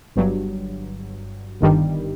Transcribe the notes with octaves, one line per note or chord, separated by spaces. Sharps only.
G1 G2 F#3
G1 G2 D#3 G3